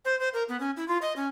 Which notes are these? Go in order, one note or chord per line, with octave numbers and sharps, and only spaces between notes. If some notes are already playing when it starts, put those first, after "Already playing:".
C5
C5
A#4
B3
C#4
E4
F4
D#5
C#4